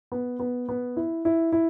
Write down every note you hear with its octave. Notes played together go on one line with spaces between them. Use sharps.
B3
B3
B3
E4
E4
E4